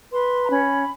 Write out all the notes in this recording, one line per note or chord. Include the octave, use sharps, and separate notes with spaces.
B4 C6
A#5
C#4 B5